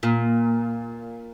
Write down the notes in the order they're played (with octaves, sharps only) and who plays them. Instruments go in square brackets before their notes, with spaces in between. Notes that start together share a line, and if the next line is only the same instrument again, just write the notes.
[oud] A#2